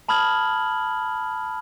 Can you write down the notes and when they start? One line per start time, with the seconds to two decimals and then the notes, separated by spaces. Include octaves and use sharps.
0.09 A5 B5 D#6 F6 G#6 F#7